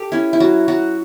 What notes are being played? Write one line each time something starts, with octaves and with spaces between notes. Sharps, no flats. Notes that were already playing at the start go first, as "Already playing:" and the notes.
Already playing: G4 A4
C#4 E4
E4
F#3 F#4
F#3 F#4